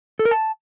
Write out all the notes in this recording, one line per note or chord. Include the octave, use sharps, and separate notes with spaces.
A4
A#4
A5